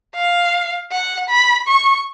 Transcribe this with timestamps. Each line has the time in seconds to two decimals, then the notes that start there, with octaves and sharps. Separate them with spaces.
0.15 F5
0.91 F#5
1.30 B5
1.67 C#6